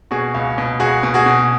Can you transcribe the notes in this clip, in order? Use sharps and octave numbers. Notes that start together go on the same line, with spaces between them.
B2 F#4 G#4
C#2
B2
C#2 F#4 G#4
B2
F#4 G#4
B2